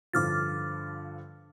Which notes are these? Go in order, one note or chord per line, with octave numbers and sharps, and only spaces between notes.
G2 D3 F3 D6 F6 A6